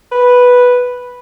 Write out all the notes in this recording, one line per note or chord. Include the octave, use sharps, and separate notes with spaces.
B4